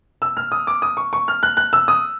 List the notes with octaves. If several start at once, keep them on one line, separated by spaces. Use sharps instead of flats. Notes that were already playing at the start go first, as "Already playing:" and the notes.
E6
F6
D#6
D6
D#6
C#6
C#6
F6
F#6
F#6
E6
D#6